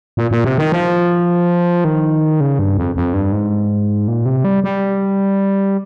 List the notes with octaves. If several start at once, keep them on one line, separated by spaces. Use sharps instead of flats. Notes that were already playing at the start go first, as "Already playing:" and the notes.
A#2
A#2
C3
D#3
F3
D#3
C#3
G2
F2
F2
G2
G#2
A#2
C3
G3
G3